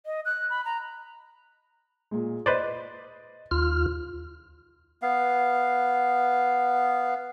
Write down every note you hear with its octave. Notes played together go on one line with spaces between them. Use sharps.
D#5
F#6
B5
A#5
A#2 G#3
B4 C5 D5 D#5 A6
D#2 F4 F6
B3 F5